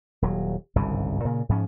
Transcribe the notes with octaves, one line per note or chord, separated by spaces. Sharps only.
D#1 F#3
G1 C2 G#2 C#3
A#2 C#3
G#2 F3 C#4